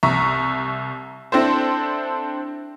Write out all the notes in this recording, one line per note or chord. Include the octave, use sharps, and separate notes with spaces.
C2 E5 A#5 C#6
C4 D4 E4 A4 C5